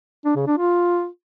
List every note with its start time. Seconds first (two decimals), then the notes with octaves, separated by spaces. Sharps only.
0.25 D4
0.36 C#3
0.47 D4
0.58 F4